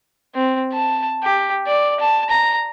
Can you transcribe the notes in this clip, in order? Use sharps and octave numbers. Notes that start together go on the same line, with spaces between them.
C4
A5
G4
D5
A5
A#5